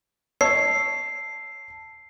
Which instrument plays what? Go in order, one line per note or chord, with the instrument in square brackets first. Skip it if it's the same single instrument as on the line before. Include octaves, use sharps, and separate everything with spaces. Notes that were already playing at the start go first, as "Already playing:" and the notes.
[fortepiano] C#5 D#5 [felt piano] A5 E6 [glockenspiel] C7